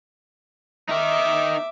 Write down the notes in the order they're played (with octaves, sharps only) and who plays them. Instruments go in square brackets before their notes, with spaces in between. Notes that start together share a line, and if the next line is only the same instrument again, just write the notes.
[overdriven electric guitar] D#4 A#4 [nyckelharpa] E5 D6